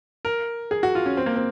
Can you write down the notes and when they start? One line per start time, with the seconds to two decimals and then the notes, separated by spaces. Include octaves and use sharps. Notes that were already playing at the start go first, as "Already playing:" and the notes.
0.25 A#4
0.71 G#4
0.83 F#4
0.95 F4
1.06 C#4
1.17 C4
1.26 A#3
1.36 C4